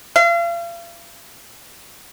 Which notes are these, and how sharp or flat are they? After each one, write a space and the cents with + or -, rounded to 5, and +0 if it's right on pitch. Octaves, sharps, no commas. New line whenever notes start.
F5 -40